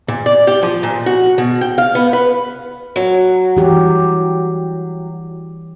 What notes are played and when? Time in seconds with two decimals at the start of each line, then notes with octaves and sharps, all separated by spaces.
0.08 A#2
0.26 D5
0.47 G4
0.63 F3
0.83 A#2
1.06 F#4
1.38 B2
1.61 G5
1.78 F5
1.95 B3
2.13 B4
2.96 F#3
3.57 E3 G4